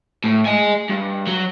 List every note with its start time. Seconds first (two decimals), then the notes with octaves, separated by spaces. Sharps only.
0.24 A2
0.45 D#5 G#5
0.89 G2
1.27 F#3